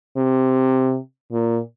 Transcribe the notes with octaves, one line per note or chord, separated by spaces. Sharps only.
C3
A#2